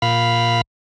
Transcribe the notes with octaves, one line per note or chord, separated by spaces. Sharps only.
A#2 F5 B5